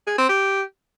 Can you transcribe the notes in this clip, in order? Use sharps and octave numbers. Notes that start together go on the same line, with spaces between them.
G#4
C4
G4